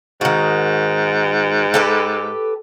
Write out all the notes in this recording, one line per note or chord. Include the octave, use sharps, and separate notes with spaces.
G#2 D#3 F#4
G4 A4 B4